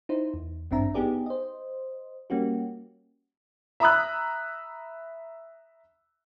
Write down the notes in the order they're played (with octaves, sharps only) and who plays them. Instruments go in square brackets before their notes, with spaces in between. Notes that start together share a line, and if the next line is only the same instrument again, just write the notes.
[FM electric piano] D#4 E4 C5
E2
G#1 G2 C4 D4 E5 A#5
B3 D#4 G4 G#4 D5
C5 D#5
G3 A#3 C#4 F#4 G4
[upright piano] E5 A#5 B5 D#6 E6 F#6